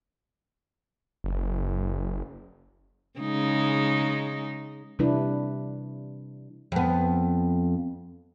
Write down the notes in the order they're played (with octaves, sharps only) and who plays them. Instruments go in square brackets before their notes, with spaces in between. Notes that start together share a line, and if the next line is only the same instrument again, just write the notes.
[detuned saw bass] F#1
[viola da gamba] C#3 G#3 D#4
[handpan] C3 E3 G3 D4 E4 B4
[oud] F2 B3